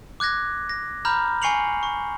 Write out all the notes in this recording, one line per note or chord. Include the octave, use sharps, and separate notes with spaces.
D6 F#6 G#6 A#6
A#6
A#5 B5 F6 G6
G#5 C#6 C7 C#7 F7 F#7
C#6